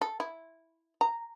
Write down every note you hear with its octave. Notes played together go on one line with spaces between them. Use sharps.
A4
E4
A#5